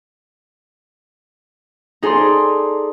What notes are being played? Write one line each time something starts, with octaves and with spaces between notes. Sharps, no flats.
D#4 G#4 A4 D5 D#5 C6